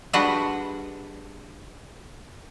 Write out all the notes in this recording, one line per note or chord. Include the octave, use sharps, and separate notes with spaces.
G3 G#3 D4 F#4 B4 F#5